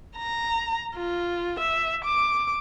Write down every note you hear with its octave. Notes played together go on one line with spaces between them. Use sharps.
A#5
F4
E5
D6